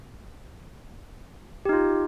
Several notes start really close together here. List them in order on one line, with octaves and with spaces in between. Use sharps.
G4 D#4 F4